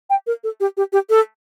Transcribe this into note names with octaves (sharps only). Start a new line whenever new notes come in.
G5
A#4
A4
G4
G4
G4
A4